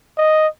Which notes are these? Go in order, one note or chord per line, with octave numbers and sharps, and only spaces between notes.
D#5